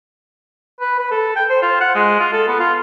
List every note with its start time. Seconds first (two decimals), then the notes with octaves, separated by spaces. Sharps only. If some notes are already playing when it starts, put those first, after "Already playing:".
0.80 B4
0.99 B4
1.11 A4
1.36 G5
1.50 C5
1.62 F4
1.81 F#5
1.95 G#3
2.20 F4
2.33 A4
2.48 B3
2.59 F4